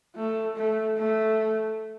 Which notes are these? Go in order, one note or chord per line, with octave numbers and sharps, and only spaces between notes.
A3
A3
A3